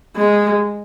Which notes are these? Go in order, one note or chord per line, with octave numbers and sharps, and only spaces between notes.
G#3